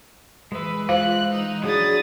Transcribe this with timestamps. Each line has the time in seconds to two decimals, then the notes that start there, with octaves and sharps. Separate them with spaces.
0.52 E3 G#3 B4 E5
0.89 F4 C5 F5 F#6
1.32 D#4
1.64 F#3 D4 E4 G#4 D#6 A6